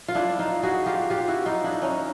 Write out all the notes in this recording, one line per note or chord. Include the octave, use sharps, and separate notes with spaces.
F4
D4 E4
D#4 F4
F#4 G#4
F4 G4
F4 G4
E4 F#4
D#4 F4
D4 E4
C#4 D#4